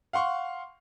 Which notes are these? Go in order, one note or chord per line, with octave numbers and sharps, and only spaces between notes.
F5 F#5 C6 C#6